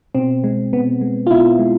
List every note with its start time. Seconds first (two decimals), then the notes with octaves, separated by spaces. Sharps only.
0.15 B2 C4
0.44 G#3
0.73 B2 B3
1.01 G#3
1.27 F4
1.31 B2 E4
1.59 G#3